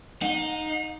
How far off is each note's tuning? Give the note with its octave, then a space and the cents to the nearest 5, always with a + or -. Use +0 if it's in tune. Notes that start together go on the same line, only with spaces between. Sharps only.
D#4 +0 F#5 -45